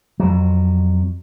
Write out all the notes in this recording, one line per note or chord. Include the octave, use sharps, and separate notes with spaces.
F2 F#3